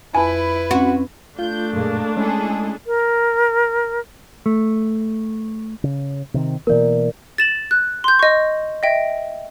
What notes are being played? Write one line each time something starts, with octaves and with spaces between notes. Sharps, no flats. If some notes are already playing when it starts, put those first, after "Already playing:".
F2 E4 B4 G#5
C4 C#4 F#4
A3 D4 F4 G6
F#2 A#2 G#3 A#3
G#3 C#4 E4 G#4 A4
A#4
A3
C#3
C3 D#3 C4
B2 E3 A#3 A#4 D5
A6 E7 F#7
F#6
C6 G6
D#5 C#6
D#5 E5 G5